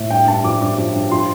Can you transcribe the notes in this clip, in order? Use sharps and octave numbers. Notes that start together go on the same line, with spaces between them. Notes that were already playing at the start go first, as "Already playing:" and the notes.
Already playing: A2
G2 G5
G2 A5
F3 D6
G2 D6
F3
G2
F3 C6